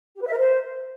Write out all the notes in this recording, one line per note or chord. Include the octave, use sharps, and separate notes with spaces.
G4
B4
E5
A#4
C5